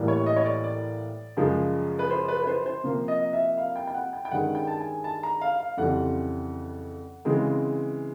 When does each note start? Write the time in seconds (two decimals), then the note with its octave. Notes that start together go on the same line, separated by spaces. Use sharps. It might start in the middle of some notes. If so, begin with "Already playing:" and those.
Already playing: A2 E3 G3 A#3
0.08 C#5
0.26 D#5
0.36 C#5
0.45 D5
0.64 D5
1.37 F#2 C#3 F3 G#3
1.99 B4
2.10 C5
2.28 B4
2.43 B4
2.47 C5
2.66 C5
2.84 C3 F3 A#3
3.08 D#5
3.33 E5
3.58 F5
3.76 G5
3.87 G5
3.94 F#5
4.13 G5
4.25 G5
4.32 G2 D#3 G#3 C#4 F#5
4.55 G5
4.67 A5
4.80 G#5
5.04 A5
5.23 A#5
5.41 F5
5.60 F5
5.77 F2 C#3 E3 G3 C4 F#5
7.25 C#3 E3 G#3 C4